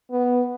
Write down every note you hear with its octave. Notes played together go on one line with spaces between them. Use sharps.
B3